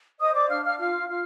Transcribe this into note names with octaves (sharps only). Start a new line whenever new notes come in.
C5 D#5 D#6
D5 D6
D4 F5 F6
F5 F6
F4 F5 F6
F4 F5 F6